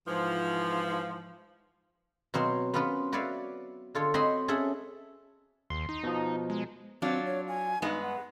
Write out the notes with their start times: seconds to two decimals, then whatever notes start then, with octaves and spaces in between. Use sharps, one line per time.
0.07 G#2 E3 F3
2.34 B2 F#3 C4 F5 C6
2.74 B3 C#4 F4 A#4 B4
3.12 F#4 B4 C#5 D5 E5 F5
3.95 D3 F4 A4 C#5
4.14 C4 F#4 C#5 D#5 B5 C6
4.48 C#4 G#4 A4 E5 F#5
5.70 D#2 C6
5.89 D#4
6.03 B2 F3
6.50 G#3
7.02 F#3 C4 D4 F4
7.26 C#5
7.48 G#5
7.82 G2 G#3 B3 D#4
8.02 F#5